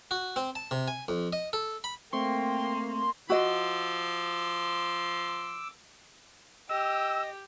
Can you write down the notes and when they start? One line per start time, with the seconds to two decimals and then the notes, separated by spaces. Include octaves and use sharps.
0.11 F#4
0.36 C4
0.55 A5
0.71 C3
0.88 G#5
1.08 F2
1.33 D#5
1.53 A4
1.84 B5
2.13 A3 A#3 C4 G5 C6 C#6
3.30 F3 F#4 D#5 C6 D6 E6
6.69 G4 D#5 G5 E6